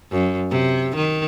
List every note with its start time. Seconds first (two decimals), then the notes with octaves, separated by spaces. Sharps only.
0.11 F#2
0.50 C3
0.96 D#3